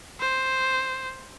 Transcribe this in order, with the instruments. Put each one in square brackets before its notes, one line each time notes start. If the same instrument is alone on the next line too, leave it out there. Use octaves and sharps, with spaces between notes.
[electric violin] C5